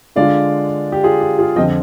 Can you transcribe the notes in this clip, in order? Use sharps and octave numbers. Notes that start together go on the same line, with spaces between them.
D3 G#3 D4 F4 D5 F5
G4
F4 G#4
G4
F4 G#4
F2 D3 F3 C4 D#5 G5